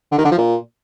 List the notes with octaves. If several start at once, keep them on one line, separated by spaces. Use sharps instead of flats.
D3
D#3
D3
F3
A#2